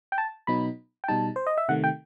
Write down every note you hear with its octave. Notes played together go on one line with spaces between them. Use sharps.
G5
A5
B2 F#3 B3 D#4 B5
G5
B2 G3 D#4 A5
C5
D#5
E5
C3 D#3 A3 F#5
G5